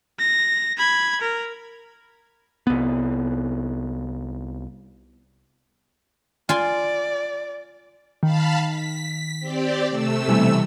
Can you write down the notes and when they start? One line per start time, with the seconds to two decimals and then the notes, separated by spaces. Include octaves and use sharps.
0.19 A#6
0.78 B5 G#6
1.21 A#4
2.67 C2 B3
6.49 F4 D5 G#5 C6
8.23 D#3 F5 A5 B5
8.65 B6
9.40 C4 G4 D5
9.89 C3 A3 E6
10.27 B2 E3 G3